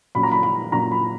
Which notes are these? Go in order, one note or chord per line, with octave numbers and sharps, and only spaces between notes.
A#2 F#3 C#4 B5
A#5
B5
B5
A#2 F#3 C#4 A#5
B5